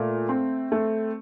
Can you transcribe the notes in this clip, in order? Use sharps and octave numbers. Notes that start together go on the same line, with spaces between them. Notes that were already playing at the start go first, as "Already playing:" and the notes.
Already playing: A#2 A3
C4
A3